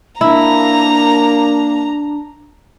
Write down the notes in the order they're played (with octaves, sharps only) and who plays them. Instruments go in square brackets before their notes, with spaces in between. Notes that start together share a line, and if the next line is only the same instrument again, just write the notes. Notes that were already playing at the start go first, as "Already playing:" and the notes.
[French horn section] A#3 [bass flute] D4 [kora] E4 [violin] A#5